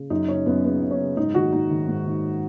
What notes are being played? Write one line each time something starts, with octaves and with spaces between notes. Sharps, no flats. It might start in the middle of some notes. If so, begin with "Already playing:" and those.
Already playing: C#3
F#2 D#4
C#3 C#4
F#2 B3
C#3 B3
F#2
C#4
C#3
G#2 D#4
D#3 F#4
G#2 D#4
D#3
G#2
D#3